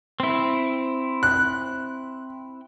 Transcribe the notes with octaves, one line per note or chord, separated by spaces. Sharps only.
C4 E4
F#6